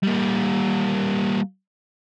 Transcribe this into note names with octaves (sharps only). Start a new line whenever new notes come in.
G3 A#3